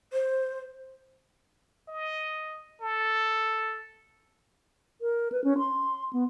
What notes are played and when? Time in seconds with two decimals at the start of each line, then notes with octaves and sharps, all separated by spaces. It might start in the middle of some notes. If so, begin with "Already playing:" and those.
0.13 C5
1.88 D#5
2.81 A4
5.01 A#4
5.32 B4
5.44 C#4
5.58 C6
6.13 B3